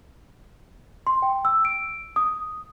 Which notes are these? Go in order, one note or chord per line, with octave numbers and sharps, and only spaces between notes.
C6
G5
E6
D7
D#6